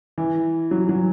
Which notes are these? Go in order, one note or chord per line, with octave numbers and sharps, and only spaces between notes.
E3
F#3
F#3